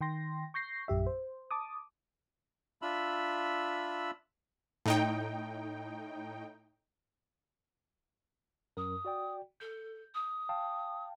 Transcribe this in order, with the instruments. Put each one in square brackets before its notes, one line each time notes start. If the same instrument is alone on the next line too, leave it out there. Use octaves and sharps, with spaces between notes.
[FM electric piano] D#3 G5 C6 A#6
C#6 G6 A#6 C7
A#1 F#2 G4 E5
C5
A5 D6 D#6
[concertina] D4 F4 E5 B5 E6
[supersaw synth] A2 D#4 G5
[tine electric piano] F#2 A#4 [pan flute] D#6
[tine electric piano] F#4 D5 G5
[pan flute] A4 [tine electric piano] G6
[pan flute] D#6
[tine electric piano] F5 G5 A5